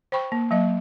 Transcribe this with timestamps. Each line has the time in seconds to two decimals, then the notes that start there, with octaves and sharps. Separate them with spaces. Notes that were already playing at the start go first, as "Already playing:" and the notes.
0.12 C5 G5 B5 C#6
0.32 A#3
0.51 F#3 A#3 D#5